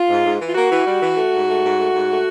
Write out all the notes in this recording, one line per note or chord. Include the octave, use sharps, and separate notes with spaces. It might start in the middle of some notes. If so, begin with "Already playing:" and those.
Already playing: F4
G#2
G#2
E3
F4
A#3 F#4
E3
G3
E3
A3
G#2
A3
G#2
A3
G#2
A3